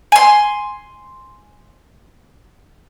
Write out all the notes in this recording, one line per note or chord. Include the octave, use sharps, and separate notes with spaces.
G#5 C6